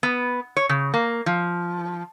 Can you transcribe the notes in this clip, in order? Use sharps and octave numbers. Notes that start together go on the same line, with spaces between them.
B3
C#5
C#3
A#3
F3